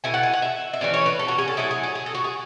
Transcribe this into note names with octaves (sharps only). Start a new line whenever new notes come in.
B2 A3 E4 G#5
F#5
G#5
F#5
E5
E5
E3 A3 C#4 D5
C#5
B4
A4
F#4
G#4
A4
F#3 A3 E4 G#4
G#4
G#4
G#4
A4
F#4
G#4